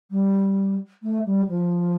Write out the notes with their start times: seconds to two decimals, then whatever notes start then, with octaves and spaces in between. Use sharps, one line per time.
0.11 G3
1.03 A3
1.25 G3
1.49 F3